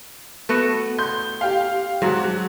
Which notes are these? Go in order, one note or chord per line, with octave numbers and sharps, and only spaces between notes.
A3 B3 F#4
C6 G6
G4 F5
G#2 F#3 D4 F#4